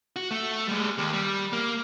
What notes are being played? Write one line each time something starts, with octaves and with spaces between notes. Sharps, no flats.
F#4
A3
G3 G#3
D#2
G3
A#3